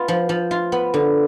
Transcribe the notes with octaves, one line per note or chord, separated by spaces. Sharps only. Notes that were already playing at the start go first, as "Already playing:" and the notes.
Already playing: B3 F4
F3
F3
F4
B3
D3